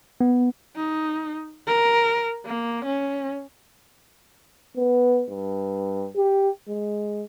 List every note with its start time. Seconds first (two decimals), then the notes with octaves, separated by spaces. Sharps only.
0.21 B3
0.76 D#4
1.67 A#4
2.46 A#3
2.85 C#4
4.76 B3
5.30 G2
6.16 G4
6.69 G#3